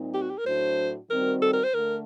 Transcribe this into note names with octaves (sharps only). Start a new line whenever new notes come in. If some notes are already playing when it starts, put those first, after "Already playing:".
Already playing: A#2 G3 C4 D#4
G4
F#4
G4
A#4
A2 F#3 A3 D4 F#4 C5
D#3 G3 C4 F#4 A#4
A4
A#4
C5
D3 A3 A#4